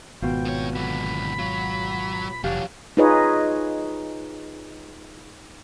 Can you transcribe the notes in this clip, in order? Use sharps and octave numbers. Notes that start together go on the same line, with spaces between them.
G#1 B2 F4 G5
A2 C#5
D3 F#3 B5
F#3 F4
F1 E3 F#3 D4 G4 C#5 F5
D#4 F4 G#4 B4 C#5 D#5